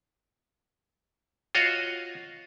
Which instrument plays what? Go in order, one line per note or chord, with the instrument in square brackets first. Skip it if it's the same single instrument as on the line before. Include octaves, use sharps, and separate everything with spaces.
[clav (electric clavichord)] F4 F#4 C#5 D#5 F5